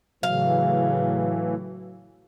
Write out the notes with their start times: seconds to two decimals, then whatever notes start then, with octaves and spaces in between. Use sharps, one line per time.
0.23 A2 C#3 E3 F#3 F5